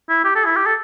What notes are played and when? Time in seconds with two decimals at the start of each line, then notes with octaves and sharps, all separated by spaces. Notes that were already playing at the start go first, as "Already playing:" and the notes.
0.09 E4
0.24 G4
0.35 A4
0.45 E4
0.56 G4
0.66 A4